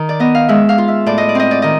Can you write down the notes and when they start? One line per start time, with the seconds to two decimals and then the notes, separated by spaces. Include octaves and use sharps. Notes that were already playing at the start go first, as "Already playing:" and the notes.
Already playing: D#3
0.09 D5
0.20 B3 D#5
0.35 F5
0.49 G#3 E5
0.69 F5
0.78 F4
0.88 E5
1.06 A2 D5
1.18 D#5
1.29 D5
1.35 C4 D#5
1.51 D5
1.62 D#3 D#5